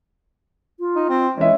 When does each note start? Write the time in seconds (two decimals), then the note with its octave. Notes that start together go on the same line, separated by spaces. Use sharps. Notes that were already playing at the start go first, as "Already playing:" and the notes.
0.80 F4
0.96 D#4
1.09 C4
1.38 E3 G#3 C#4 E5